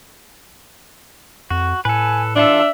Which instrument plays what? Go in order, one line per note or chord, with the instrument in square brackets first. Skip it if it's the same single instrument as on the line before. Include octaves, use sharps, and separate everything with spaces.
[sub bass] F2 [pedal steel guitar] F#4
[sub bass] A2 [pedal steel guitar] A4 B4 [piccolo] G#5
[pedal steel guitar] E3 F4 A4 [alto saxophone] D4 [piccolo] E5